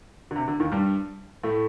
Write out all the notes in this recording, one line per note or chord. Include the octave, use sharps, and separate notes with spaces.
D3
C3
D3
D#2 D#3
G2 G3
A2 A3